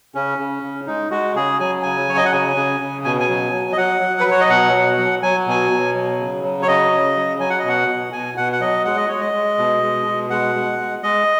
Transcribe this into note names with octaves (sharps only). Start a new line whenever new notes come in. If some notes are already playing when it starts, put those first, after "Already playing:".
C#3 C#4
C#3
C#3
G#3 D#4
G#3 F#4
C#3 G#4
F#3 G#5
C#3 G#5
F#3 C#5
D#5
F#5
C#3 G#5
C#3
C#3
B2 G#5
G#5
F#3
F#3
D#5
F#3 F#5
F#3
B4
F#3 C#5
D#5
B2 F#5
F#3
F#3
F#3 G#5
B2 G#5
B2
F#3
C#3
F#3
C#5
C#3 D#5
C#3
F#3
F#3 G#5
F#5
D#5
B2 F#5
B2
B2 G#5
B2 F#5
F#5
F#3 D#5
G#3 F#5
D#5
G#3 C#5
D#5
G#3
B2
G#3
B2
G#3 F#5
G#3
G#3
G#3 D#5